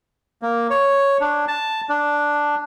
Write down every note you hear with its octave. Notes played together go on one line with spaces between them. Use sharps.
A#3
C#5
D4
A5
D4